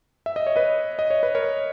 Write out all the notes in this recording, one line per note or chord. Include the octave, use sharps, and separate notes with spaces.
E5
D#5
C#5
B4 D#5
D#5
C#5
B4
A#4 C#5